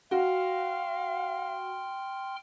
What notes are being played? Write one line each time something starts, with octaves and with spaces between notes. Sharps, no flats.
F#4 F5 G5 C6 F6